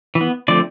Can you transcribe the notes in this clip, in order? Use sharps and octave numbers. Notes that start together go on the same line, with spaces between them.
E3
B3
D3 F3 A3 C4 D5